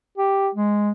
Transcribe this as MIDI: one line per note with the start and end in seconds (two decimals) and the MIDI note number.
0.18 0.49 67
0.55 0.91 56